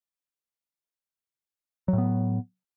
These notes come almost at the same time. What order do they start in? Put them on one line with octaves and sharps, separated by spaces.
F#3 A2 B3